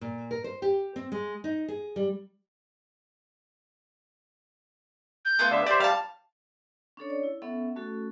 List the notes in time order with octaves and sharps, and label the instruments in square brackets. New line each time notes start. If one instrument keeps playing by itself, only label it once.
[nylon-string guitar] A#2
A#4
C5
G4
C4
G#3
D#4
G#4
G3
[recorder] G6
[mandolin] A3 B3 F4
[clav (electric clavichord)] D3 [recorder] E5
[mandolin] G4 [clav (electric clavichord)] C5 D5
[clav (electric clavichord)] G3 [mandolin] F5 A5
[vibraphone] C#4 D4 A4 C#5
C#5 D5
E4
B3 C#4 A4 E5 F#5
A3 C#4 F#4 A4